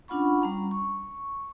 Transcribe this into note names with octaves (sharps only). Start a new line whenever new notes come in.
C#4 D4 F4 F#5 B5 C#6
G3 C#4 A#5
C#6